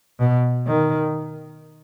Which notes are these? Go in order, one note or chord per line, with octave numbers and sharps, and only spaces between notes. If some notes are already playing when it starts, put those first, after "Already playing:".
B2
D#3